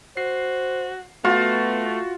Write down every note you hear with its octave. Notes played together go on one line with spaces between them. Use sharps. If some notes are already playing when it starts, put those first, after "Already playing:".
F#4 C5 C7
A3 B3 F4 F#4